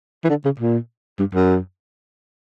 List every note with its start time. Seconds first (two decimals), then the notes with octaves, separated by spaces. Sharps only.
0.24 E3
0.29 D3
0.45 C#3
0.59 A#2
1.19 G2
1.34 F#2